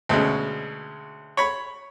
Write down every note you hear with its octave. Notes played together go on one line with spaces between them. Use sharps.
D2 B2 G#3 C#4
C#5 B5